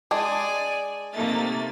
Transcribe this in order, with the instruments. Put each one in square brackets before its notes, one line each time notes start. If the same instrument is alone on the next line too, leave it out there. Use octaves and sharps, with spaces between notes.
[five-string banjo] G#3 D4 G#4 [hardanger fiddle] D5 G#5
[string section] C3 A#3 A6 [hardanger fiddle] A3 D#4